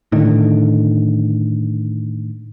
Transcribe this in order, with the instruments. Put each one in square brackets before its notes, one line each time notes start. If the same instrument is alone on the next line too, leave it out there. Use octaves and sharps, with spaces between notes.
[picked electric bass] A2 D3 D#3